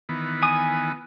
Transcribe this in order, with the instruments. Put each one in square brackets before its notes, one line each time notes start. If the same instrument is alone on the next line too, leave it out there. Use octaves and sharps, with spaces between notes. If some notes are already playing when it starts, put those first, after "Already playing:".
[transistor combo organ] D#3 E3 B3
[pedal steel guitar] G#5 D#6